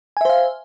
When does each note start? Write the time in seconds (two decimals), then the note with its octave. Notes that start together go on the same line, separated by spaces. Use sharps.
0.17 G#5
0.21 E5
0.25 C5
0.29 F5